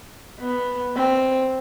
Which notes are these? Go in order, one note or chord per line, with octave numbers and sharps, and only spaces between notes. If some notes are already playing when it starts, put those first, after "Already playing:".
B3
C4